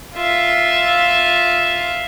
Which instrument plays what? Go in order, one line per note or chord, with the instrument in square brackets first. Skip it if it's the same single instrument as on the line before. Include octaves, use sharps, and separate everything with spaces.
[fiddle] F4 E5